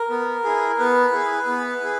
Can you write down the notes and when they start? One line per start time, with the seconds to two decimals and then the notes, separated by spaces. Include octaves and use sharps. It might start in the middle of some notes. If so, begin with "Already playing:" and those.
Already playing: A#4
0.10 B3
0.44 E4 G#4
0.78 B3 B4
1.12 E4 G#4
1.46 B3
1.81 E4 G#4